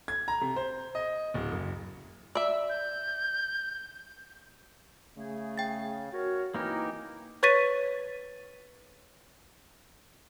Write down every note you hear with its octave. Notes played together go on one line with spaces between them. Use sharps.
G#6
A#5
C3
C5
D#5
D1
F#1
D5 E5 E6
G6
C#3 A3 G#4
G5 A6
F#4 A#4 C#5
E3 A#3 C4 D#4 E4 G4 A#4
B4 C#5 C#6 A6 B6 D#7